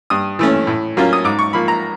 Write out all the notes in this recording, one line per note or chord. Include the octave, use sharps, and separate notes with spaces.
G2 D#6
E3 A3 C#4
A2
F#3 A#3 C#4 F4
D#6
G#2 D6
C#6
F3 A#3 B5
A#5